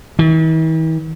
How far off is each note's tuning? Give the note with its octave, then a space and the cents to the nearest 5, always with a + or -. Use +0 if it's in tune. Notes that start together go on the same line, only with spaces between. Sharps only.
E3 -45